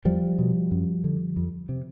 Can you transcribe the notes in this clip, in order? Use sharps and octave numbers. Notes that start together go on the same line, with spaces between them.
E2 F3 G3
B2
F#2
D3
F2
C3